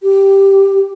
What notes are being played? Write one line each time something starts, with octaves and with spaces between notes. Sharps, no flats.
G4